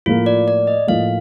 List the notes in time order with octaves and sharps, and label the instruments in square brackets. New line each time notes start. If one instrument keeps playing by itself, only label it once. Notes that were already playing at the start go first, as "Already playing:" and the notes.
[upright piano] A2 F3 A#3 [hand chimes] F4
[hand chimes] D5
D5
D#5
[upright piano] A2 F3 A#3 [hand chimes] F5